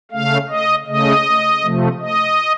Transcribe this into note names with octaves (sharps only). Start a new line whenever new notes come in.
C#3 A3 F5
D#5
C#3 A3 D#5
C3 F3 A3
D#5